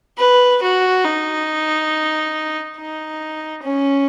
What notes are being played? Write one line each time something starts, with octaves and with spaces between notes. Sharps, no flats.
B4
F#4
D#4
D#4
C#4